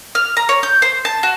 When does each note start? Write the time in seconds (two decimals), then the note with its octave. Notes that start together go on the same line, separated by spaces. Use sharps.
0.15 F6
0.37 A#5
0.49 C#5
0.63 G6
0.82 C5
1.05 A5
1.23 F#4